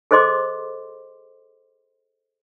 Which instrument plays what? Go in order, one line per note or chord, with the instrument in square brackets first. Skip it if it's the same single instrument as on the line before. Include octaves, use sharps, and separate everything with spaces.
[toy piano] G#4 A4 C5 D#5 C6 D6